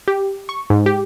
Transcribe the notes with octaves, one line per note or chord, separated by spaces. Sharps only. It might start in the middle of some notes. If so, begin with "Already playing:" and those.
G4
C#6
G#2
G4